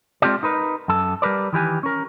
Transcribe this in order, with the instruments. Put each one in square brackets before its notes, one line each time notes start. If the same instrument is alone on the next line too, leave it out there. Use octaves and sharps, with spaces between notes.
[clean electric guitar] G#3 C4 F4 G4 A4 D5
D#4 A#4 B4
F#2 A4
G3 A#4 B4 D5
D#3 E3 G4 G#5
C#4 A#4